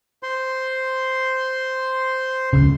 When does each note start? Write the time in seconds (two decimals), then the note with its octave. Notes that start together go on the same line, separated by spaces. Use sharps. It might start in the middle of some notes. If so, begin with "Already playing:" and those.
0.23 C5 C6
2.53 F1 C#2 C#3